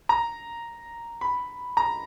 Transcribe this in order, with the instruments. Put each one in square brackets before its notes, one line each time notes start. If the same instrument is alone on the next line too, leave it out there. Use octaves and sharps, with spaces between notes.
[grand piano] A#5
B5
A#5